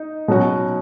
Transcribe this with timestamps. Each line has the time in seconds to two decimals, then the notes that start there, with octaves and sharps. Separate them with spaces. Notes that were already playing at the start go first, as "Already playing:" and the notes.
Already playing: D#4
0.28 B2 F#3 C#4 F#4